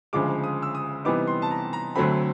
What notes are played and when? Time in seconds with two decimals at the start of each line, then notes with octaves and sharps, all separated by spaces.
0.13 D2 C#3 F3 G#3 D6
0.44 D#6
0.62 E6
0.75 D#6
1.05 C3 E3 G3 B3 D#4 D6
1.27 C6
1.42 A5
1.51 A#5
1.73 A#5
1.95 D2 D3 F#3 A3 C4 B5